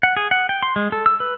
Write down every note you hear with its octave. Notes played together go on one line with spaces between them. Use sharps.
F#5
G#4
F#5
G5
C6
G#3
A4
E6
B4